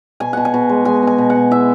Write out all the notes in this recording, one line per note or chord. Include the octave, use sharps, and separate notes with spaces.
B2 G#5
B2 F#5
G#5
B2
G#3
G#3 G#5
B2 G#5
B2
F#5
B2
E3 E5